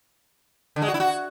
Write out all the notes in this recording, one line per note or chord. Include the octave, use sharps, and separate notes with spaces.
D3
G#3
F#4
E4
F#4